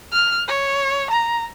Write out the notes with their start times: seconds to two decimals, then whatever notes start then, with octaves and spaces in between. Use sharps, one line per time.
0.12 F6
0.48 C#5
1.11 A#5